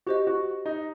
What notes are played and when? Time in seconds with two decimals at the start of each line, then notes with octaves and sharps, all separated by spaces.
0.07 F#4 G4 C5 D#5
0.27 F#4
0.66 D#4